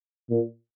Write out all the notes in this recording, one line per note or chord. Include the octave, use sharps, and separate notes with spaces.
A#2